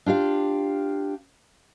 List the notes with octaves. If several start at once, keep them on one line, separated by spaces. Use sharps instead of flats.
D4 F4 G4 F5